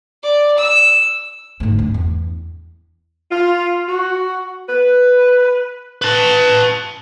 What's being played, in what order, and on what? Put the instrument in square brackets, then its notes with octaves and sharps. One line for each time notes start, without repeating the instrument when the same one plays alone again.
[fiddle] D5
E6
[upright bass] D2 G#2
D4
E2
[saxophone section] F4
F#4
B4
[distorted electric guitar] B4 A5